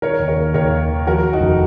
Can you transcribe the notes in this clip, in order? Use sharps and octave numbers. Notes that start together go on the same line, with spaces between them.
D#3 A#4 C#5
D#2
A#4 C#5
D#2
D#2 A#4 C#5
D#3
D#3
F3 F#4 A#4
F3
D#4 F#4
F1